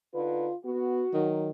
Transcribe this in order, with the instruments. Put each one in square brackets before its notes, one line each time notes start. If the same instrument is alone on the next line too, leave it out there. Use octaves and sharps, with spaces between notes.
[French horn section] D3 D#4 B4 [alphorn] F4
[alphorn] B3 [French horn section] F#4
[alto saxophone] D#3 [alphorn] F#3